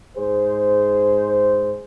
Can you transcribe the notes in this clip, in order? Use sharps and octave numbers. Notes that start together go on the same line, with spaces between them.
G#2 G#4 C5